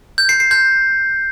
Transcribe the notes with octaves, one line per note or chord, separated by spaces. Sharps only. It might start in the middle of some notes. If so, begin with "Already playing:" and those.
G6
C7
C7
G6